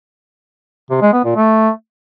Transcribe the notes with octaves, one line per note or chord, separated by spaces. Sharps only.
C3
G#3
B3
A#2
A3